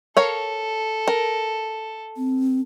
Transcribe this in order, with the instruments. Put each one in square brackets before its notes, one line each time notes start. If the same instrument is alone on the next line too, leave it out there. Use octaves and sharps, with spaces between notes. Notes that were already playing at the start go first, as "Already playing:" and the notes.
[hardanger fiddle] A4 [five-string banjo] A#4 C#5 F5
[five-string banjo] A#4
[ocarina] C4